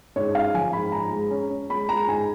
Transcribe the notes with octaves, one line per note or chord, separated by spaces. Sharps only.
G#2 C#5
C#4 F5
F3 G#5
G#2 B5
G#2 A#5
G#3
C#4
C#4
G#3 B5
G#3 A#5
G#2 G#5